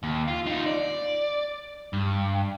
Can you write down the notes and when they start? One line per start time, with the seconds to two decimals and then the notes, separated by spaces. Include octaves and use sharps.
0.03 D#2
0.28 F4
0.46 D#4 F4
0.66 D5
1.93 G2